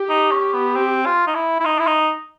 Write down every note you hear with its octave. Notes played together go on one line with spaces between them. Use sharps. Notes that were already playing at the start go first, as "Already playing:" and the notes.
Already playing: G4
D#4
C#4
B3
C4
F4
D#4
E4
E4
D#4
E4
D#4